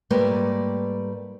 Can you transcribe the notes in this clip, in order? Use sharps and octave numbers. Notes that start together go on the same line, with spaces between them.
G#2 G3 A3 A#3 B4 D5